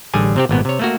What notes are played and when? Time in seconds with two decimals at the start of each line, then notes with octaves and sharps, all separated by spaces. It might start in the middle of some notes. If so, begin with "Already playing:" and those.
0.14 A1 D3 G3 G#4 G#5
0.36 C3 C4 G4
0.49 G#1 A#2 B3
0.65 C3 C#5
0.79 A3 A#3 F#4